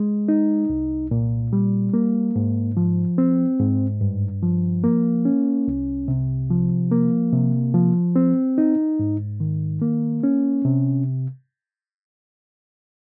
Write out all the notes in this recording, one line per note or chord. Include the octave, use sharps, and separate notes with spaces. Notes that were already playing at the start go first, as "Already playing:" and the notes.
Already playing: G#3
D#4
C2
A#2
G3
A#3
G#2
F3
C4
G#2
G2
F3
A#3
C#4
C2
C3
F3
A#3
C3
F3
C4
D#4
G#2
D#3
A#3
C#4
C3